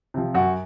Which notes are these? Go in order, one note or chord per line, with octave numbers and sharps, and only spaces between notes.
C3 F3
F#2 F#4